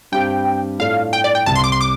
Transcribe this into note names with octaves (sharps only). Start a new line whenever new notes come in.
G2 G3 C4 G4 G5
A2 A3 D4 F4 A4 F5
G5
D5
G5
C2 C3 G3 A5
C6
D6
C6
D6